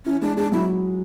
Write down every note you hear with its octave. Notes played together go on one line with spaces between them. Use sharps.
E3 C#4 E4
G#3 D4 G#4
G#3 D4 G#4
F#3 E4 F#4